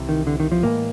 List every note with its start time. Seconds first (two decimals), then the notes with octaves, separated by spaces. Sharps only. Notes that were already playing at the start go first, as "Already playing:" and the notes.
Already playing: C2 C3 E3
0.09 D#3
0.27 D3
0.40 D#3
0.52 F3
0.63 A2 E3 G#3 A#3